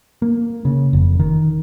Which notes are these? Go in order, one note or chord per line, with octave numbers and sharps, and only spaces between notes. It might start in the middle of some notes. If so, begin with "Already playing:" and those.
A#3
C#3
F1
D#3